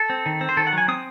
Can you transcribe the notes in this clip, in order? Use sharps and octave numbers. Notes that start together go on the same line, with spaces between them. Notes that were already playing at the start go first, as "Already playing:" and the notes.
Already playing: A4
C4
D#3
C4
C5
D#3 A4
F#5
F#3 G#5
C4 D#6